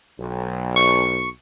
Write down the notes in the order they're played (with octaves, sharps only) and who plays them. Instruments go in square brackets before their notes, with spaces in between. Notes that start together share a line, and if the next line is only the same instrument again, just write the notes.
[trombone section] B1
[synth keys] C#6